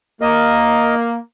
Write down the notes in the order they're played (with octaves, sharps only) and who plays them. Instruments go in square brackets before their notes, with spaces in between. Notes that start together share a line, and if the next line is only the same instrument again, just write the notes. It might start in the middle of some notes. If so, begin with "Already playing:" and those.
[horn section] A#3 [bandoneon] D#5